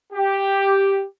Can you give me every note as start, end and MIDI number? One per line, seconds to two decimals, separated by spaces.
0.13 1.03 67